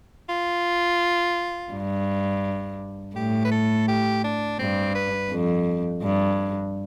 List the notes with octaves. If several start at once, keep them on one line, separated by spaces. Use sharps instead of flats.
F4
G2
A2 G4
B4
A4
G4
D4
G2 C4
B4
F2
G2